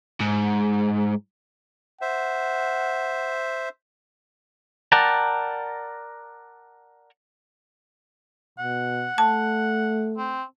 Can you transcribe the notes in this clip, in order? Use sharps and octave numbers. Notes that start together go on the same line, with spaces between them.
G#2
C5 E5 F#5
A#4 D5 F#5 G5 A5 A#5
B2 F#5
A3 A5
C4